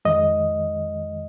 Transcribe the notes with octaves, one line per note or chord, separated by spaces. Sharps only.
F2 D#3 G#3 D#5